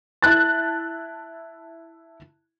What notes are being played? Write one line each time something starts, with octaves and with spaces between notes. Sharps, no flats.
E4 A5 F#6 A6